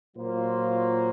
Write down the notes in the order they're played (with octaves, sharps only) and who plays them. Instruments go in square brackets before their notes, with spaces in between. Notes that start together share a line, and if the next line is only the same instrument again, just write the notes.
[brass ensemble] A#2 F#3 A#3 F4 C5